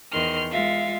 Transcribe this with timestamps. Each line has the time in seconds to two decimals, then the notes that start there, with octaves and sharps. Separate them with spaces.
0.12 E2 D#3 C6 F6
0.51 G#3 F4 E5 F5